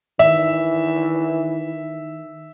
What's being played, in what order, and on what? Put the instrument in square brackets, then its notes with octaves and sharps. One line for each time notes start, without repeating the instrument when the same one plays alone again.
[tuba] D#3 [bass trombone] E3 [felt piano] E5